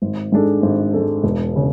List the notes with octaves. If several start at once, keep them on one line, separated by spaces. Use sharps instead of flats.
G#1
G#2 G#3 D4 A4
G#1
G#2 G#3 D4 A4
E1
C#3